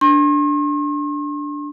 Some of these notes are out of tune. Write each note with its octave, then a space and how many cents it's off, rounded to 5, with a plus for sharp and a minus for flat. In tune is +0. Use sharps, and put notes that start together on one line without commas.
D4 +0 C6 +45